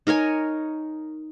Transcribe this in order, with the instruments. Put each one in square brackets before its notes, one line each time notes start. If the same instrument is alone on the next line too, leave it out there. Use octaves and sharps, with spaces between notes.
[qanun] D#4 A#4 C#5 G#5